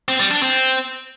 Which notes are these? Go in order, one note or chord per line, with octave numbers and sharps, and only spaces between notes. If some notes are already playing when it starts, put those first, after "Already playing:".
C4
G3
D4
C4